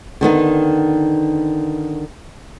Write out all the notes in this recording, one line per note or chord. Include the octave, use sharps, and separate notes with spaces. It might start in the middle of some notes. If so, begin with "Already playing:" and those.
D3 D#3 B3 D#4